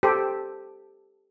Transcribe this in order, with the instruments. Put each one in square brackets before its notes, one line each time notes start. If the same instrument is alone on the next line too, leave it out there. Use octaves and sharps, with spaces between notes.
[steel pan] G4 A4 C5